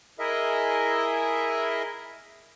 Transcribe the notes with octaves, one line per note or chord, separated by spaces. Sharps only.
E4 G#4 A#4 D#5 E5